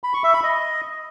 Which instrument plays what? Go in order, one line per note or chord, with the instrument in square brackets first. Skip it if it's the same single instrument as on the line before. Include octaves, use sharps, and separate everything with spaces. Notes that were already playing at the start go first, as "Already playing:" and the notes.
[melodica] B5
C#6
E5
B5
D#5